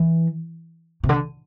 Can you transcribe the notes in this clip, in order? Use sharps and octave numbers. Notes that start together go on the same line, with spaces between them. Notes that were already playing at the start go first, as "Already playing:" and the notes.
Already playing: E3
C3
D3